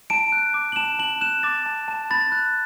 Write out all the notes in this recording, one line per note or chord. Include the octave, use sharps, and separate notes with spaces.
A5 D7
F#6
D6
F#7
A5 E7
A5 F#7
F#6 E7
D6 A6
A5
A5
B5 A6
F#6